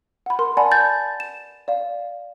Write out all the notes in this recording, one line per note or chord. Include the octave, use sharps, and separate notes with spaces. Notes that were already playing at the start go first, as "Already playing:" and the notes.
F#5 B5
A#4 C6
D5 F#5 G#5 A5 B5
G6 A6
E7
D5 F5